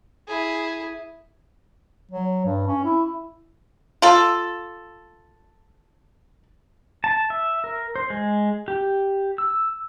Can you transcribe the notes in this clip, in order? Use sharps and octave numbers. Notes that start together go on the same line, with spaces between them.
E4 G#4
F#3
G2
C#4
E4
F4 A4
A5
E5
A#4
C5
G#3
G4
E6